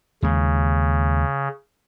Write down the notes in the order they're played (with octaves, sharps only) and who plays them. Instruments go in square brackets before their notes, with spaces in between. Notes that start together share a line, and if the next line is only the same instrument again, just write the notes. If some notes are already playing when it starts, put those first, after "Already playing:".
[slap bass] D#2 G#3 [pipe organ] C#3